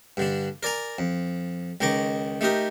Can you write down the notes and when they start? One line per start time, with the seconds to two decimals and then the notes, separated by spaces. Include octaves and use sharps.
0.17 G2 D3 D4
0.63 A#4 D5 G#5 A#5
0.99 F2
1.81 C#2 D#3 D#4 D#5 C#6 D6
2.41 A3 D#4 G4 A#4 D#6